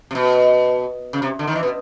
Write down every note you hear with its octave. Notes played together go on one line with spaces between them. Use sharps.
C3
B2
C#3
C3
D3
D#3
E3
B2